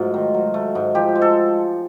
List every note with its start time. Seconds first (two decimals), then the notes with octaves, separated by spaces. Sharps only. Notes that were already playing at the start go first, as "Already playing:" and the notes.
Already playing: G#2 F#3 A3 F4
0.14 D#3
0.34 F#3
0.54 A3
0.75 G#2
0.95 F3 G4
1.15 G#3
1.22 A4